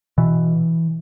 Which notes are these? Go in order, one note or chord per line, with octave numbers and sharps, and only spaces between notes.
B2 E3